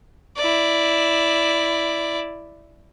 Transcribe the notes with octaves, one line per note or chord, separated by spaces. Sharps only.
E4 D5